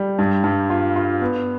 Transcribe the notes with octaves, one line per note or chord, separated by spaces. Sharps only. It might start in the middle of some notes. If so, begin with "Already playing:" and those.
Already playing: G3
G2
G2
F4
F4
B3